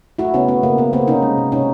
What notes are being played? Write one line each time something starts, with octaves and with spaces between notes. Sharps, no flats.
A3 E4 F#4
C#3 B3 C#4
A3 B3
C#3 A#3
C#3 B3
C#3 A#3 C4
C3 C#4 D#4
G#3
C3
C3 C#4 D#4